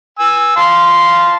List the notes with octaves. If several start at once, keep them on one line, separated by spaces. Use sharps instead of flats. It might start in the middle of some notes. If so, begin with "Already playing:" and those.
G#5 E6
F5 A5 C6